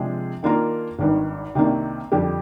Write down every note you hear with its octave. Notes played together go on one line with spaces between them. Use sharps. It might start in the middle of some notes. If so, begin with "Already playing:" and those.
Already playing: C3 F3 G#3 D4 G#4
D#3 A#3 D4 F4 A#4
G#1 G2 D#3
C2 C3 D#3 A#3 D4
F2 D3 G3 D4 G4